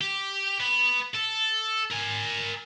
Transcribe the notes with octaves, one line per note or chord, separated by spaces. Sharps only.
G4
B3
A4
A#4 G#5